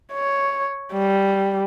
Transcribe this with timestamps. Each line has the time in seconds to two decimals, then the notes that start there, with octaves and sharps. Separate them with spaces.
0.13 C#5
0.93 G3